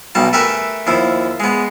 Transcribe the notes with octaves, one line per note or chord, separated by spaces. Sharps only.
B1 B2 G3 A5
A3 G4 A#4 B4 E5 G#5
D#2 F3 E4
G#3 B3